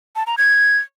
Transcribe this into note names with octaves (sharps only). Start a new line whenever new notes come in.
A5
A#5
G#6